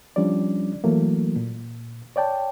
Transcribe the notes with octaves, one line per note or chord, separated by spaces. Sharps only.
F3 G3 C#4 D4 D5
E3 F#3 A3 A#3
A#2
C#5 D5 G5 A5